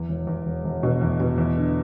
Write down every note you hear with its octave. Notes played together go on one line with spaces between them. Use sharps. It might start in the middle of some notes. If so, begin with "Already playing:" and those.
Already playing: E2
E1
E2
E1
E1
B2
E2
B2
E2
D3